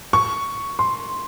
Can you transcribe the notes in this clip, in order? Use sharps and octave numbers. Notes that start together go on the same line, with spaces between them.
C#6
C6